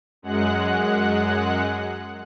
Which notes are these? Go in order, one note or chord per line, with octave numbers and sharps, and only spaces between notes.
F#2 G#3 F#5 F#6